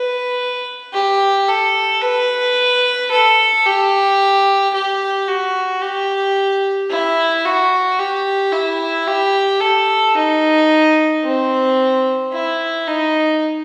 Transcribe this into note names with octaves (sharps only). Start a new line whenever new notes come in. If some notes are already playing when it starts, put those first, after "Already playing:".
Already playing: B4
G4
A4
B4
A4
G4
G4
F#4
G4
E4
F#4
G4
E4
G4
A4
D#4
C4
E4
D#4